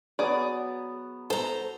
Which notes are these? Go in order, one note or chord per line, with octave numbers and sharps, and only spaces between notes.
F#3 B3 G#4 D5
A4 C5 A#5